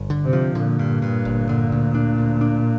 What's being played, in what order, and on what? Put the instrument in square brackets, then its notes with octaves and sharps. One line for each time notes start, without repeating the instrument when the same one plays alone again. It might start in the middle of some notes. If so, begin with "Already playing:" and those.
Already playing: [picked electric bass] G1
D3
[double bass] C3
[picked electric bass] F3
[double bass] A#2 [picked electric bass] D3
[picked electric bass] G2
G2
G1
D3
D2
D4
D2
D4